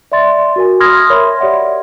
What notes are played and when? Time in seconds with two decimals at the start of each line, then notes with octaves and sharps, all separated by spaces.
0.12 D5 E5 C6 A6
0.56 F#4 A#4 G#5
0.80 B5 C6 D#6 F6 G#6 A#6
1.10 A#4 C#5 E5 B5 C6
1.39 G4 C#5 D5 E5 F#5 C6